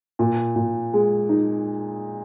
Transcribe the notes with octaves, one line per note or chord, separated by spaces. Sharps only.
A#2
A#2
G#3
D#4